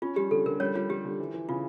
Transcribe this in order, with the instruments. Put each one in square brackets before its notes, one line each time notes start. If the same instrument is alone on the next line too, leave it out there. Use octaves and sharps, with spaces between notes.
[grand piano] C#4 [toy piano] F4
[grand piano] G3 [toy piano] G4
[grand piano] D3 [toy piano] A4
[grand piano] D3 [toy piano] A#4
[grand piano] G3 [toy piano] C#4 C#5
[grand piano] G3 [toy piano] F4
[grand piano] G3 [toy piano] G4
[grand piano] D3
E3
E3
[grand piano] C#3 [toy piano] F4